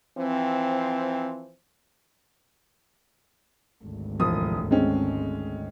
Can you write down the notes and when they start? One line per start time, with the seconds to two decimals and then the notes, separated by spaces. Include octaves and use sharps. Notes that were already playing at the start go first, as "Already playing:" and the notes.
0.18 E3 F3 C4
3.84 G#1 D2
4.20 E1 F3 D#6
4.71 G#3 C4 C#4